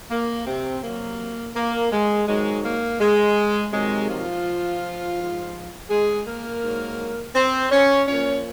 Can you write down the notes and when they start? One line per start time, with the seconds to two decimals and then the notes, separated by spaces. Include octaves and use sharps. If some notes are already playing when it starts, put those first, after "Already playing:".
0.11 A#3
0.47 C3 C4
0.83 C3 F#3 A#3
1.56 A#3
1.92 G#3
2.28 G#2 D#3 F#3 G#3
2.64 A#3
3.00 G#3
3.73 C3 D#3 F#3 G#3
4.09 F3 F4
5.18 G#2 F3
5.90 G#3 G#4
6.27 A#3 A#4
6.63 G#2 F#3
7.35 C4 C5
7.72 C#4 C#5
8.08 A#2 F3 C#4 C#5